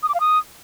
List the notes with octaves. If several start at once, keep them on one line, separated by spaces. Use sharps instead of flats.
D#6
D6
F5
D#6